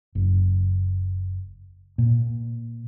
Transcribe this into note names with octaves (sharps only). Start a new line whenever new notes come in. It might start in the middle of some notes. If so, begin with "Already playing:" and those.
F#1
A#2